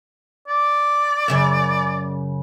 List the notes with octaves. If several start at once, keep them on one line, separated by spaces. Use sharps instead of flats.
D5
F#2 C#3 E5